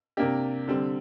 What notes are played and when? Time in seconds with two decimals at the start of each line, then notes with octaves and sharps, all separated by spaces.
0.17 C3 A#3 D4 G4
0.68 D3 G3 C4